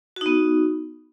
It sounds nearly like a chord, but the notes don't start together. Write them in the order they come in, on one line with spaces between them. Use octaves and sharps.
F#4 D#4 B3